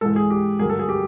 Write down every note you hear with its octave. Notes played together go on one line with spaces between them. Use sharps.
G#2 E3 G#3 A4
G#4
G4
G2 D3 F#3 A#3 G#4
A4
G#4
G4